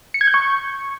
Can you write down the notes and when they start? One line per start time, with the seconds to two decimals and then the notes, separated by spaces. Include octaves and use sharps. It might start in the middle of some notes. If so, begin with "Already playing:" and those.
0.14 C#7
0.21 G#6
0.27 G6
0.34 C#6